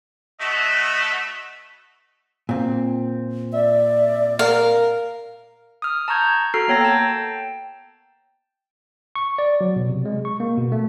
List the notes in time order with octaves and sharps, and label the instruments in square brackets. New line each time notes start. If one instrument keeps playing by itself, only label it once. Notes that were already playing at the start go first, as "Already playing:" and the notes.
[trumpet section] A3 B3 F#4 D#5 E5
[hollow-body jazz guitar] A#2 C4
[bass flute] D5 [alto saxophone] E5
[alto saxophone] A#4 [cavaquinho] F5
[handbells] D#6 F6
A5 A#5 C#6 G6 G#6
F#4 A4 A#5 F6 C7
A#3 B3 C#5 G5 A#5 A#6
G5 A5
[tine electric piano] C#6
D5
F#3
B2
C3
G#3
C#6
A#3
B2
A3